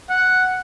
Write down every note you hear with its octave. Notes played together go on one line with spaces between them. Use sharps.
F#5